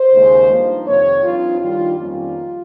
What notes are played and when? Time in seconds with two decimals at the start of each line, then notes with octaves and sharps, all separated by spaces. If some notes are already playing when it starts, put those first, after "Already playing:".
Already playing: C5
0.12 D#2 C#3 G#3 C#4
0.49 G2 F3 A#3 D#4
0.87 F2 C3 D#3 C#5
1.23 G2 F3 C4 D#4 F4
1.61 G2 D#3 G3 F4
1.98 F2 D#3 G3 A#3 C#4 F4